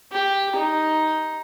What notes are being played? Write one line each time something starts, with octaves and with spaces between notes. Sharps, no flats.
G4
D#4